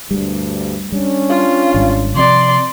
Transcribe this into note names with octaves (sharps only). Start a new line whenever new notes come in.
D2 G2 G3 D4
G3 C#4 D4
F4
G#1 G3
C3 F3 C4 D5 C6